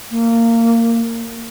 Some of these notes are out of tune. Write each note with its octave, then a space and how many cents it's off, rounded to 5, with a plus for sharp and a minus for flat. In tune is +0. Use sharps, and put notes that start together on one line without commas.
A#3 -20